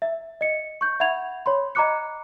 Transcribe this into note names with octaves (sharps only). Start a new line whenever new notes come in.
E5
D#5 C#7
C#6 G6
E5 F#5 B5 G#6 F7
C#5 B5 C6
D#5 A#5 B5 D6 F#6 C#7